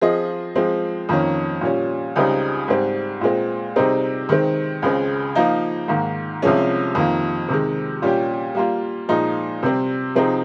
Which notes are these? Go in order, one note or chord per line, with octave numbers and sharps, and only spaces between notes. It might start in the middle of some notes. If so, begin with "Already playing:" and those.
F3 C4 F4 G#4 D#5
F3 G#3 C4
F2 D#3 A#3 C#4
A#2 G3 C#4
C#2 C#3 G3 C4 D#4
G#2 G3 C4
A#2 G#3 C4
C3 G3 C4 D#4 G#4
D#3 G#3 C4
C#2 C#3 G#3 C4
F3 A#3 D#4
G#2 D#3 A#3
C2 C3 F3 G#3 C#4
F2 D#3 A#3
C3 D#3 G#3
A#2 G3 C#4 G4
G3 A#3 F4
A#2 F3 G#3 D#4
C3 G3 C4
C3 F3 C4 D#4 G#4